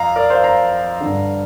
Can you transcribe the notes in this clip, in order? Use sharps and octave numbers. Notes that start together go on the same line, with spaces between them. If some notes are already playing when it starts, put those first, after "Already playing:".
Already playing: F2 F5 A#5
A#4 D5
C5 F5
F5 A#5
G2 D3